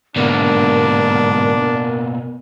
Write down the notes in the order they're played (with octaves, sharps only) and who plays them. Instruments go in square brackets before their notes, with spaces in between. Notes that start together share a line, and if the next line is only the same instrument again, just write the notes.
[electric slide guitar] G#2 D3 [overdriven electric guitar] B2 A#3 [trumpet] D4 [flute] A#4